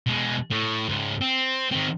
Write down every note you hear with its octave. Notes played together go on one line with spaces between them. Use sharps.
B2 G#3
A2
C#2 G#2
C4
D#3 C4